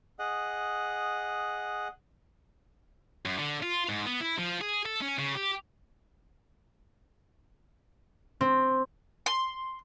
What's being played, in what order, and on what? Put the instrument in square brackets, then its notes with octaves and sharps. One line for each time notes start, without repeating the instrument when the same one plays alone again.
[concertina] G#4 D#5 F#5
[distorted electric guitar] F#2
D3
F4
G#2
B3
E4
F3
G#4
A4
C#4
C#3
G4
[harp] C4
[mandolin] C6